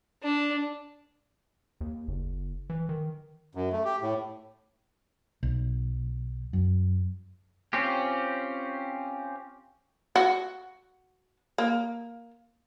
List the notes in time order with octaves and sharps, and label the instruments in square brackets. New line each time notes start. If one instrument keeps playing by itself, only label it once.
[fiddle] D4
[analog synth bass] D#2
F#1
E3
D#3
[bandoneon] F#2
A3
G4
A2
[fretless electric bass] B1
F#2
[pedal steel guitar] C4 C#4 F4 G4
[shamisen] F#4
A#3